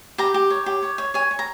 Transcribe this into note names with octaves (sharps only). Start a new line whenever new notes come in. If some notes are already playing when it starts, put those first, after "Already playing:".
G4 A#5
G4
C#5
G4
C#5
C#5
C#5 G#5
C#5
A#5